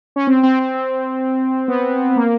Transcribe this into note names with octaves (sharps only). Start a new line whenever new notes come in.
C#4
C4
C4
C4
C4
B3
A#3